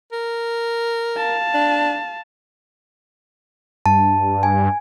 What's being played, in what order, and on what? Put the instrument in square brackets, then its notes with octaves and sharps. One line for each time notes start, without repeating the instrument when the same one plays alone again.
[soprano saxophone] A#4
[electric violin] F5 A5
[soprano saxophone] D4
[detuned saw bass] G2 [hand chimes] A5
[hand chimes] G#5